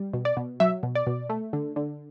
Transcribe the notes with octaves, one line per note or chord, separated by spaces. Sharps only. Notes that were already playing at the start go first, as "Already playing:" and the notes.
Already playing: G3
B2
D5
B2
F#3 E5
B2
D5
B2
A3
D3
D3